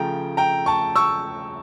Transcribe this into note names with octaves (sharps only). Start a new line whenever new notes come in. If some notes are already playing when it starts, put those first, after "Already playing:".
Already playing: C#3 F3 A3 G5 A#5
G5 A#5
A5 C#6
C#6 E6